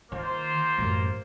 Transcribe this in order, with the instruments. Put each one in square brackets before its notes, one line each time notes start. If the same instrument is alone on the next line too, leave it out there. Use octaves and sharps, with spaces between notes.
[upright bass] D#3 [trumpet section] A#3 F4 C5
[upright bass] A1 F#2